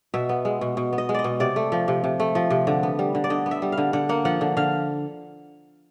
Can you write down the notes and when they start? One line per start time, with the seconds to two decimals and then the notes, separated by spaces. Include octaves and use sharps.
0.14 B2 E5
0.29 B3
0.45 G#3
0.61 B2
0.77 B2
0.93 B3
0.98 D#5
1.09 G#3
1.14 D5 D#5
1.24 B2
1.40 C3 D5
1.56 A3
1.72 F3
1.88 C3
2.04 C3
2.20 A3
2.35 F3
2.50 C3
2.67 D3
2.83 B3
2.99 G3
3.15 D3
3.24 D5
3.30 D3 D#5
3.46 B3
3.51 E5
3.62 G3
3.72 F5
3.78 D3
3.93 D3 F#5
4.09 A#3 F#5
4.25 F3 F#5
4.41 D3
4.57 D3 F5